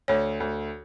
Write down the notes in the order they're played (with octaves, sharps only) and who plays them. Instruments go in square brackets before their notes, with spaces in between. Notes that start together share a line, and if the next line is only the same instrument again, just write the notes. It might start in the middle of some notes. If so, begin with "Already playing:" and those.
[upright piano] D2 [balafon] C#5
[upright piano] D2